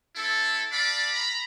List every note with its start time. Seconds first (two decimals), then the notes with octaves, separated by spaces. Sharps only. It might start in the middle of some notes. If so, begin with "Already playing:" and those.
0.16 C4 E4 A4
0.72 A4 D5 F5 B5
1.13 A#5 B5